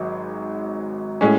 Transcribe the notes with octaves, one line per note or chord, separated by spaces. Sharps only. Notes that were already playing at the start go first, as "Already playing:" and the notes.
Already playing: G#1 G#2 F#3
A2 G#3 C#4